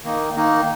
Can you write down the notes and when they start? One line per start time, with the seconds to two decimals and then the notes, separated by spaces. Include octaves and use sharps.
0.04 D#3 A#3 D#4
0.36 D#3 A#3 D#4